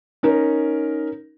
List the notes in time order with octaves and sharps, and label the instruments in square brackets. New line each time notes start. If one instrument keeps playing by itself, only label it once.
[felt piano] C#4 D#4 A#4